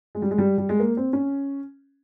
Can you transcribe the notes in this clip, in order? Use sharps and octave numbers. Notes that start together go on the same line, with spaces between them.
G#3
G3
G#3
G3
G3
G#3
A#3
C4
C#4